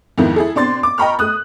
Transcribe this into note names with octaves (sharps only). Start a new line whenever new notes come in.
F2 G#2 D#3 F3 B3 E4
E4 G#4 A4
B2 C4 D4 D5 C6 A6
D6
D#5 G5 A#5 B5 C#6 F6
A3 D#6 F#6